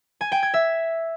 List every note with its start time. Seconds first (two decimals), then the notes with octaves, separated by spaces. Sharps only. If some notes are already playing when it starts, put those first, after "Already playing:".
0.21 G#5
0.32 G5
0.43 G#6
0.54 E5